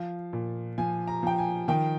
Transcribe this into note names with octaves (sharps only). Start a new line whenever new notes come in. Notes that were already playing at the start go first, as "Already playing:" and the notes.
Already playing: F3 F5
A#2
F3 G#5
A#5
F3 G5
G#5
D#3 G5